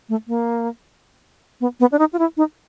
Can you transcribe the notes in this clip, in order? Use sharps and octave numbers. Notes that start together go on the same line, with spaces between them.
A3
A#3
B3
B3
D4
D#4
F4
E4
D#4